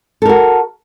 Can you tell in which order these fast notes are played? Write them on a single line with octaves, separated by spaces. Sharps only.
A4 A#4 F#4